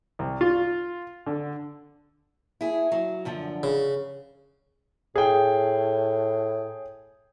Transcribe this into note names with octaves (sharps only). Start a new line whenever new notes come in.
C2
F4
D3
E4 G#4
F#3
F#2 D3 F3
C#3
A2 G#4 G5